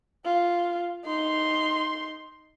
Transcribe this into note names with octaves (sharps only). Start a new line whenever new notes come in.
F4
D#4 C6